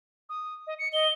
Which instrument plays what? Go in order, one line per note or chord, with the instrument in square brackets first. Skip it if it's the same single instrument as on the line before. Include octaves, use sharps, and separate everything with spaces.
[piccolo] D#6
D#5
C#7
[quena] D#5 [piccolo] G7